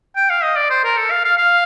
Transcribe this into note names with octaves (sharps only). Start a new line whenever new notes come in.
G5
F5
D#5
D5
C5
A#4
A4
F5
F5
F5